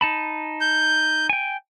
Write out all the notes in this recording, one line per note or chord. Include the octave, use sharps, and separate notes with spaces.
D#4 A5 B5
G6
G5 G#5